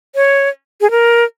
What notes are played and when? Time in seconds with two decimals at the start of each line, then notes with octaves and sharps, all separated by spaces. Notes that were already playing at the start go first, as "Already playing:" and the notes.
0.15 C#5
0.81 G#4
0.91 A#4